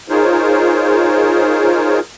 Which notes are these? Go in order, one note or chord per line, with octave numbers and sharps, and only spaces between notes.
D#4 F4 G#4 A#4 C5 C#5